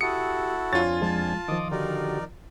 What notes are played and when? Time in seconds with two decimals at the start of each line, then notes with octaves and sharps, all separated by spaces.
0.01 E4 F#4 G4 A4 D#6 C#7
0.73 F2 D4 F4 C#5 G#5 A6
1.02 F3 G#3 A5
1.48 D#3 F3 D#5 D6 D#6
1.71 D3 D#4 F#4 G4 A#4 D5